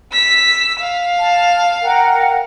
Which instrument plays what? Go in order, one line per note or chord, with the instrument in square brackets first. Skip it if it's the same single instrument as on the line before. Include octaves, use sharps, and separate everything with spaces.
[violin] E6 B6
F5
[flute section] A5
A#4 F#5 G5